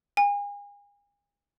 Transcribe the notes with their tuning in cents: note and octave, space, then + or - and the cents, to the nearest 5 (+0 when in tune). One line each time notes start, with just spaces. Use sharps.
G#5 -40